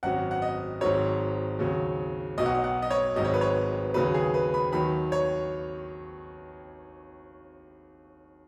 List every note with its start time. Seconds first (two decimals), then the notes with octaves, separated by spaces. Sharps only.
0.03 G#1 F#2 F#3 F#5
0.31 F#5
0.42 D#5
0.81 G#1 G#2 F#3 C#5
1.59 D#2 C#3 F#3
2.38 B1 B2 F#3 D#5
2.46 F#5
2.55 D#5
2.64 F#5
2.82 D#5
2.90 C#5
3.16 G#1 G#2 F#3 D#5
3.24 C#5
3.34 B4
3.41 C#5
3.94 D#2 C#3 F#3 B4
4.14 G#4
4.34 B4
4.54 B5
4.72 D#2 D#3 F#3 B5
5.12 C#5